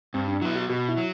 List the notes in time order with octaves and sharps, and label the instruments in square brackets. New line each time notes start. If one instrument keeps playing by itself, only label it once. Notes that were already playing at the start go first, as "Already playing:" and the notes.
[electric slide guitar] G2 [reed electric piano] C4
[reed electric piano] D4
[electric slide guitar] F#3 B3 [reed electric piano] E4
[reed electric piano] F#4
[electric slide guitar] B2 [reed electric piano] F#4
[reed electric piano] E4
[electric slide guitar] F#3